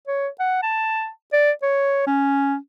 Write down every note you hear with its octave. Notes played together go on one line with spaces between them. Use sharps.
C#5
F#5
A5
D5
C#5
C#4